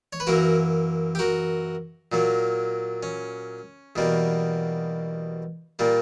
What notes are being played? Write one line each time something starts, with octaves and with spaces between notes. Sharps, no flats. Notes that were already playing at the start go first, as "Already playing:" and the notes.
C#5
B4
F#2 E3 A#3 F#4 A#4
G4
F#4 A#4
A#2 F#3 A#3
C#4
E2 B2 G3 A#3
A#2 G3 A#3